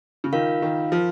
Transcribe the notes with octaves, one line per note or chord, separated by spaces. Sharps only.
C#3
D#3 F4 A#4 F5
D#3
F3